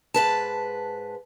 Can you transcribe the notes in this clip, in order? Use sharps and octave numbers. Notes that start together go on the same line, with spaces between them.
G#2 B4 A5